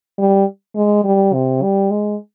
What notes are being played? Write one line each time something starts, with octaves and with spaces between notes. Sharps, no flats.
G3
G#3
G3
C3
G3
G#3